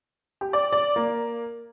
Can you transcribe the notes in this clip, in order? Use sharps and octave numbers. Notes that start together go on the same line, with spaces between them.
G4
D5
D5
A#3